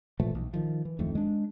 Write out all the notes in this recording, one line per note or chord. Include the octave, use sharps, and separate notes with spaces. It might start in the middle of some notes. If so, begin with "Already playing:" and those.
A#2 E3 F3 A3
B1
D#3 F3
E3
D1 F2 D#3 A3
G#3 D4